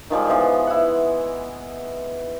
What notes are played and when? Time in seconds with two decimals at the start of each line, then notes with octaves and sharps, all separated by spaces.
0.10 D#3 F3 G3 G#3
0.29 E3 F3 B3
0.67 E4 F#5